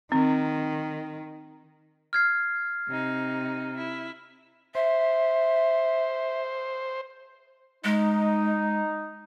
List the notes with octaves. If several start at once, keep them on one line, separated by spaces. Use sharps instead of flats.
D#3 C4
F6 G#6 C7
C3 D#4
E4
C5 E5
G#3 D#4